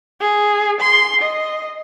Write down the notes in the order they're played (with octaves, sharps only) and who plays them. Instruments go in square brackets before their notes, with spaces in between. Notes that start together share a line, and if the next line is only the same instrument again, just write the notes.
[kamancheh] G#4
C6
D#5